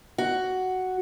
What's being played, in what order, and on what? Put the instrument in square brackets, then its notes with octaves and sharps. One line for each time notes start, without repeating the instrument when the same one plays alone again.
[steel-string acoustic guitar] F#4